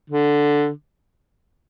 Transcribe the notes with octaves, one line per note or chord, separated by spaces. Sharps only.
D3